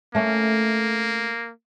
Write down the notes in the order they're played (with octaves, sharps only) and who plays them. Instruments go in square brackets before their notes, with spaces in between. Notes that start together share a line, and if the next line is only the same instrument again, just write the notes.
[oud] A3 C#4 [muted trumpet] A#3